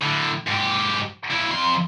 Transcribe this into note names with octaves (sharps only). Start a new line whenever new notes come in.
A2 D3
G#2 G4
A#2 E4
F2 C6